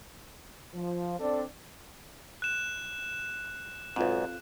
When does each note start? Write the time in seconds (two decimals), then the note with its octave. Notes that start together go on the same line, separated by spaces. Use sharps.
0.74 F3
1.20 C4 D4 A4 D5
2.42 F#6 E7
3.96 B1 G#2 C4 F4 A4